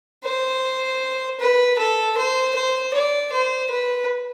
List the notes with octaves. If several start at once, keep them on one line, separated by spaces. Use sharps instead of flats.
C5
B4
A4
C5
C5
D5
C5
B4